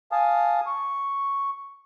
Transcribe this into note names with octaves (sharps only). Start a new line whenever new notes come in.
F5 G#5 A5 D#6
C#6